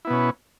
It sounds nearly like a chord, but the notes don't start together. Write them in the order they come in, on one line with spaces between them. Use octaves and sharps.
E4 B3 B2 C#4